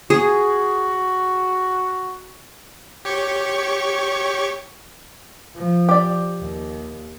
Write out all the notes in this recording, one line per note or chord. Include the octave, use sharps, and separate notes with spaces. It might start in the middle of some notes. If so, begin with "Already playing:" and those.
F#4 G#4
G4 C#5 C#6
F3
G4 D5
D#2